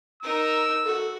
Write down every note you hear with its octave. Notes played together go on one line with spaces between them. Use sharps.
D#4 A#4 E6
F#4 A4